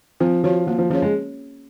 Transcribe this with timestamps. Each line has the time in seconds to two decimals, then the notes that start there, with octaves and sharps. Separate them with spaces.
0.20 F3 C4
0.44 F3 F#4 C#5
0.67 F3 A#3
0.78 F3
0.90 F3 C#4 G#4 C#5
1.02 G#3